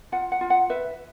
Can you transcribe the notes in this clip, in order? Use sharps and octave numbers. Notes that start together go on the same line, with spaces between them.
F4 F#5
F#5
F4
F#5
B4 E5